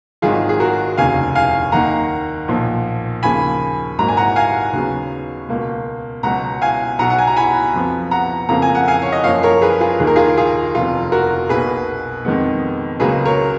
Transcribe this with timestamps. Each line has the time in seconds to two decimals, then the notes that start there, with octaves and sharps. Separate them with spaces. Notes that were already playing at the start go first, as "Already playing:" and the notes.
0.22 G#1 G#2 D#3 F#3 F4 G#4
0.49 G#4
0.60 F#4 A#4
0.97 F1 D#2 C#3 F5 G#5
1.36 F5 G#5
1.72 D#2 D#3 A#3 F#5 A#5
2.48 B1 A#2 F3
3.23 D#2 C#3 F3 A#3 G#5 B5
3.98 G#1 G#2 F#3 A#3 A#5
4.08 G#5
4.17 F#5 A#5
4.36 F5 G#5
4.73 D#2 C#3 F#3 B3
5.49 C#2 B2 A#3
6.23 C#2 B2 F#3 F#5 A#5
6.61 F5 G#5
6.99 B1 B2 F#3 F#5 A#5
7.10 F#5
7.18 G#5
7.27 A#5
7.36 G#5 B5
7.74 F2 F3 B3
8.11 F#5 A#5
8.49 F2 C#3 F3 A#3 A#5
8.62 G#5
8.75 F#5
8.88 F5 G#5
9.02 C#5
9.12 D#5
9.24 F#2 F3 A#3 C#5 F5
9.43 A#4 C#5
9.62 G#4 B4
9.81 F4 G#4
10.00 D#2 D#3 A#3 G#4
10.07 A#4
10.16 F4 G#4
10.37 F4 G#4
10.75 F1 F2 F3 B3 F4
11.12 F#4 A#4
11.49 B1 B2 A#3 G#4 B4
12.25 F2 D#3 G#3 B3
13.00 C#2 C#3 F#3 A#3 G#4 B4
13.25 A#4 C#5